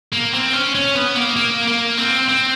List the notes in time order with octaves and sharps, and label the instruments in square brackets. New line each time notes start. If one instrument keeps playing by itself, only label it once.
[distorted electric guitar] A#3
C4
C#4
C#4
B3
A#3
A#3
A#3
C4
C4